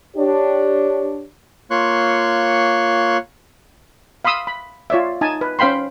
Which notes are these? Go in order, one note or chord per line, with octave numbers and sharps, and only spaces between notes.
D4 G4 C#5
A#3 F4 C#5 C6 C#6 F#6
F5 B5 C6 D#6 E6
B5
F4 C#5 D5 E5
D#4 G#5 A5
B4
C#4 C5 F5 G5 B5 C6